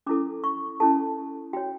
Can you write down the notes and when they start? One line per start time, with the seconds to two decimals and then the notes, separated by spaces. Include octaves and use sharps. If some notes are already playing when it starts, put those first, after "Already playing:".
0.07 C#4 E4 A4 D6
0.44 C#6
0.80 C#4 E4 A4 A5
1.53 F#4 C#5 G5